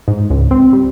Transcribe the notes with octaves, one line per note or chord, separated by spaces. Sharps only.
G#2
C#2
C4
G3